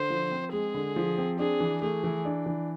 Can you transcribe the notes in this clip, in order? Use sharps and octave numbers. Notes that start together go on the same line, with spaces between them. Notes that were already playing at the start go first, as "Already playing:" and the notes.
Already playing: D3 C5
F3
C4
G#3 G#4
D3
F3
C4
D4 G#4
E3
A3 G#4
E3
D4
E3